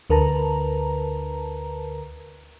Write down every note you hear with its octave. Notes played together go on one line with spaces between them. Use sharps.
D2 D3 A#4 B4 A5 A#5